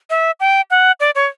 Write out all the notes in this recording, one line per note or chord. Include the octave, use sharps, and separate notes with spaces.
E5
G5
F#5
D5
C#5